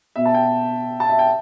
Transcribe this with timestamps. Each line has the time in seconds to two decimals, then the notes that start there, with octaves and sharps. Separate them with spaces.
0.16 B2 B3 E5
0.26 A5
0.34 G5
1.00 A5
1.09 E5
1.19 G5